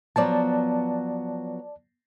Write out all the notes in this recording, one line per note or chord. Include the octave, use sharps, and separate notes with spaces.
F3 F#3 B3 D5 A5